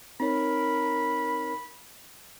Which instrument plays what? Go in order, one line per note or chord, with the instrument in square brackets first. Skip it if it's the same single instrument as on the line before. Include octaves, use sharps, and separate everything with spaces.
[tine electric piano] C4 D#4 C#5 [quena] A#4 [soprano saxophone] B5